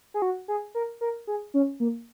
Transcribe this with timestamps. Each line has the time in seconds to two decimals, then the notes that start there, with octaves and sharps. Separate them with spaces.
0.14 G#4
0.22 F#4
0.48 G#4
0.75 A#4
1.01 A#4
1.27 G#4
1.54 C#4
1.80 A#3